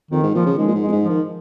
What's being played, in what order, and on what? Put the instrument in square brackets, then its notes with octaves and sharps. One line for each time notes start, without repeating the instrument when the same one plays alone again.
[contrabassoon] F2 [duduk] D#3
[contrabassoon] G#2
[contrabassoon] A#2 [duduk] F3
[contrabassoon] C#3
[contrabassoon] D#3 [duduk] G#3
[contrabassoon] A#2
G#2
[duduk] G#3
[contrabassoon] F2
G#2
[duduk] F3
[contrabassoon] D#3